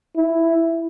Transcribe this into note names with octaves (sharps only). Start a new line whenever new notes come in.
E4